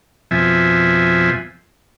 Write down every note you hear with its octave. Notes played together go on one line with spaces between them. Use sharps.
F2 B2 F3 E5 G#5